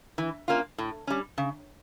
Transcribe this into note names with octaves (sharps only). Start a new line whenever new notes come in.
E3
A#3 C#4 F4
A2
G3 C#4
C#3